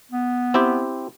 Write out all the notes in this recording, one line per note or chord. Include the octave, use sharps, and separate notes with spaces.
B3
C4 E4 G4